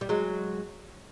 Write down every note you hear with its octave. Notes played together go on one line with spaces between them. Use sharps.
G3
F#3 G#3